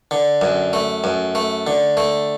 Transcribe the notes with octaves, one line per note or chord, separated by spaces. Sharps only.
D3
F#2
A3
F#2
A3
D3
A3